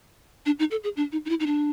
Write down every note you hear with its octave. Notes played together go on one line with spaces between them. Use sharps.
D4
D#4
A4
G#4
D4
D#4
D#4
E4
D#4
D4